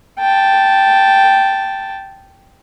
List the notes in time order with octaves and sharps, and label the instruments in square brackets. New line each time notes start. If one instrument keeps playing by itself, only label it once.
[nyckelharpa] G5 A5